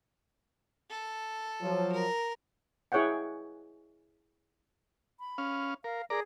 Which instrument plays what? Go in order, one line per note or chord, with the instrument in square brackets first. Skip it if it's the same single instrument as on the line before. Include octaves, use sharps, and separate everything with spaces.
[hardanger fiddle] A4
[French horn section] F3 F#3
[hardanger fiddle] A#4
[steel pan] E4 G#4 C#5 E5 F#5 G5
[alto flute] B5
[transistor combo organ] C#4 F5
[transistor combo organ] A#4 [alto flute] F5
[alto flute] G#4 [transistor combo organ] A#4 D5 A#5